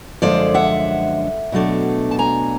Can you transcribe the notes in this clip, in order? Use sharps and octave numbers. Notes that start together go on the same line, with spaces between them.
F#2 D3 F3 G#3 C5 D5
E5 F#5
B2 F#3 A3 D4
A5
G#5 A#5